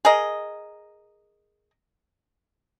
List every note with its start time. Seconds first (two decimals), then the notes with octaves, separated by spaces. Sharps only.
0.05 G#4 A#4 D#5